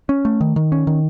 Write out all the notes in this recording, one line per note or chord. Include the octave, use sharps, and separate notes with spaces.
C#4
A3
D#3
D#3
C#4
D#3